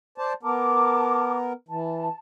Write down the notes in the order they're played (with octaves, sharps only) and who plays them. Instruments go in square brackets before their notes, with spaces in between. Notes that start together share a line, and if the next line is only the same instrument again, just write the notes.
[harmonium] C5 D5 A5
[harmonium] B3 A#4 [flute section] A5 D6
[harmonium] E3 [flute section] A5